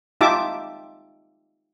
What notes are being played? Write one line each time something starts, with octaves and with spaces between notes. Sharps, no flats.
D#4 F4 G4 E5 A5 D6